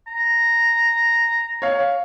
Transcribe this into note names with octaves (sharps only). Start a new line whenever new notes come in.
A#5
C#5 F5